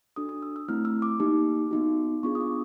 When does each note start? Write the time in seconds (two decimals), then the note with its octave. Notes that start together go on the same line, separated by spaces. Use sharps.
0.16 D4 F#4 A4 D#6
0.29 D#6
0.43 E6
0.56 E6
0.68 A3 C4 E4 F6
0.85 E6
1.02 D6
1.20 A#3 D#4 G4
1.71 B3 D#4 F#4
2.23 B3 D4 F4 G#4 C#6
2.35 D#6
2.41 D6